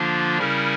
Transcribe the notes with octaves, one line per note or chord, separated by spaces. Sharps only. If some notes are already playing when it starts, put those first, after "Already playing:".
Already playing: D3 F3 A#3 D4 F4
C#3 G3 C#4 E4 A#4